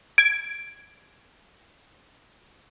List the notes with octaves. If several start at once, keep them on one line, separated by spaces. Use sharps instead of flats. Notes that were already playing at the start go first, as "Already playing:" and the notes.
G#6 D7